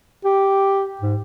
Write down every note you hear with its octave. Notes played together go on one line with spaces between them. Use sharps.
G4
G#2